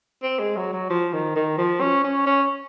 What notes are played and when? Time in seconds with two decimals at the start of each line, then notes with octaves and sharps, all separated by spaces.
0.23 C4
0.39 G#3
0.57 F#3
0.73 F#3
0.90 F3
1.13 D#3
1.36 D#3
1.58 F3
1.81 C#4
2.04 C#4
2.27 C#4